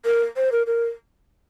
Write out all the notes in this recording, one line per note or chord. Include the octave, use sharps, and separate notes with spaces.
A#4
C5
A#4
A#4